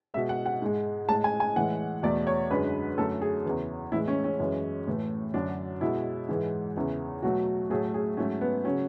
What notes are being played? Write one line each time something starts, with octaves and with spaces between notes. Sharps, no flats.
B2 G#3 E5
F#5
F#5
G#2 G#3
A2 G#3 A5
G#5
G#5
A2 E3 G#3 F#5
E2 B2 A3 D5
C#5
F#2 D3 G#3 B4
F#2 D3 A3 A4
G#4
E2 C#3 E3
A2 E3 G#3 E4
C#4
C#4
F#2 E3 G#3
A2 E3 A3
F#2 D3 F#3 D4
B2 G#3 E4
G#2 E3 G#3
E2 C#3 E3
B2 F#3 A3 F#4
A2 F#3 A3 G#4
G#4
G#2 F#3 A3 C#4
B3
C#3 F#3 C#4